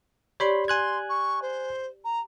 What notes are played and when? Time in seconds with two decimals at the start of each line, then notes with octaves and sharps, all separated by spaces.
0.40 G4 C#5 D5 B5 C6
0.68 G#5 C6 F#6 G#6
1.09 C#6
1.42 C5
2.04 A#5